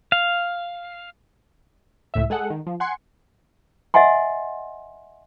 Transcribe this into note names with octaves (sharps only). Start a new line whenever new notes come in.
F5
C#2 A2 E5
G#3 G#4 A4 F#5
D#3
F3
F#5 G#5 C6 C#7
D#5 E5 F#5 G#5 C6